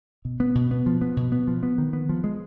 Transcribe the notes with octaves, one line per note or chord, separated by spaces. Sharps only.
B2
B3
B2
B3
F3
B3
B2
B3
F3
B3
D#3
B3
F3
G#3